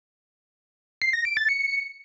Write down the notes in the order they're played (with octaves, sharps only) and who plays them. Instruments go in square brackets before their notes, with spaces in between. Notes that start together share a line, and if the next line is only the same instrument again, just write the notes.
[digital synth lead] C7
A#6
D7
A6
C#7